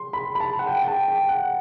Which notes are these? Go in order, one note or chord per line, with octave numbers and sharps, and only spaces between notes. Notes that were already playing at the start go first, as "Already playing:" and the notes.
Already playing: C6
B5
B5
A5
F#5
G5
G5
A5
G5
F#5